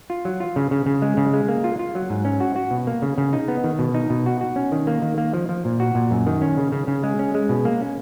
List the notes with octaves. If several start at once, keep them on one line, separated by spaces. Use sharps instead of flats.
F4
F#3
F4
C#3
C#3
C#3
G#3
C#3
G#3
A#3
F4
F4
F#3
G#2
C#4
F#4
F#4
B2
A#3
C#3
C#3
D#4
B3
D#3
B2
D#4
B2
F#4
F#4
C#4
D#3
A#3
D#3
A#3
F3
F3
A#2
F#4
A#2
F#2
D#3
C#4
C#3
C#3
C#3
G#3
C#4
G#3
B2
A#3
C#4